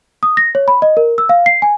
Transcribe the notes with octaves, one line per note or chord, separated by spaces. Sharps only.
D#6
A#6
C#5
B5
D#5
A#4
E6
F5
C7
G#5